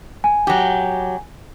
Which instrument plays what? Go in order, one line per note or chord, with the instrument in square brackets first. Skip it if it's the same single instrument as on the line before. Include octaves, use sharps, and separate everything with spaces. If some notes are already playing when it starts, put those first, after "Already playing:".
[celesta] G#5
[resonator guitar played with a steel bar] F#3 G4